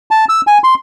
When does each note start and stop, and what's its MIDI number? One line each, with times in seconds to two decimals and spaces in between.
0.11 0.25 81
0.29 0.41 88
0.47 0.58 80
0.64 0.74 84